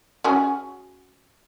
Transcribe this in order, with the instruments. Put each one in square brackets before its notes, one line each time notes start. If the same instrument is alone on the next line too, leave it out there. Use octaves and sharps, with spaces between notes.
[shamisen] C#4 F#4 G#4